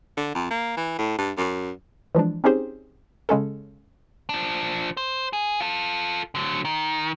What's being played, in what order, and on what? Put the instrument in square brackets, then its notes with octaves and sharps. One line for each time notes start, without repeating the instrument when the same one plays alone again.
[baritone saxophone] D3
F2
A#3
E3
A2
G2
F#2
[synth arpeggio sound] E3 F3 G#3 D4
C4 C#4 D#4 G4 G#4 C5
C#3 G#3 C#4 A4
[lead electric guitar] F3 D4
C5
G#4
F4 A4
D3 F#3
D#3